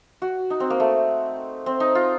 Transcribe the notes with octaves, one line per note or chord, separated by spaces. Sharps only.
F#4
D#4
C4
A#3
A3
C4
D#4
F4